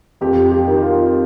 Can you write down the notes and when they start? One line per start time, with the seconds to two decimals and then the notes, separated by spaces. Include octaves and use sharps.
0.21 F2 G4
0.52 G4
0.67 D#3
0.82 F4